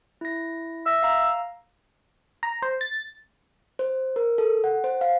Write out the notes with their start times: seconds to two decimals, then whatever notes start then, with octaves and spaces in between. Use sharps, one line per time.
0.21 E4 A#6
0.86 E5 E6 A#6
1.03 F5 A#5
2.43 A#5
2.62 C5
2.81 A6
3.79 C5
4.16 A#4
4.38 A4
4.64 F#5
4.84 C5
5.01 F5